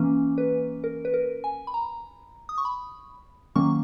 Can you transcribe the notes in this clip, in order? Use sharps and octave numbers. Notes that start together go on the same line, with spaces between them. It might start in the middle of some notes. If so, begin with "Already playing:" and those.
Already playing: E3 A#3 C#4
B4
A#4
B4
A#4
G#5
B5
A#5
D#6
C#6
B5
D#3 F#3 A#3 C#4 C#6